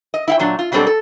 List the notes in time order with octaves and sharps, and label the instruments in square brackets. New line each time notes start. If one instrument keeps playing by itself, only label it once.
[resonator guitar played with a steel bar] D#5
E4 F5 G5
A#2 F#3 D4
F4
B2 F#3 G3 C4 D4 A4
A4